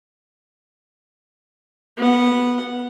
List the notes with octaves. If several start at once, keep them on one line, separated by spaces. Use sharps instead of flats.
B3 F#5